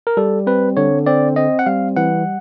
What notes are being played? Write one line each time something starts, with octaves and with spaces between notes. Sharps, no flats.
A#4
G3 A4
C4 B4
D3 C#5
C4 D5
C4 D#5
F#5
G3 F5
E3 F#5